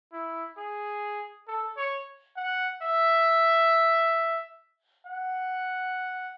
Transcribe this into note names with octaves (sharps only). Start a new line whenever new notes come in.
E4
G#4
A4
C#5
F#5
E5
F#5